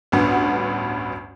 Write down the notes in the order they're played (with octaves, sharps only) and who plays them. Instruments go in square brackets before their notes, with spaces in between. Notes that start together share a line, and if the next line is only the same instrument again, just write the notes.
[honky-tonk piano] A1 D2 G2 B3 F#5